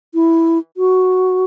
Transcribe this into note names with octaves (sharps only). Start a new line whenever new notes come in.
E4
F#4